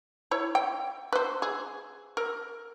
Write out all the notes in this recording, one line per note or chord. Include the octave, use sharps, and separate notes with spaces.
E4 C#5
G5
B4 C5
G#4
A#4